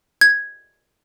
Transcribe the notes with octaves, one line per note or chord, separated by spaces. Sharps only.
G#6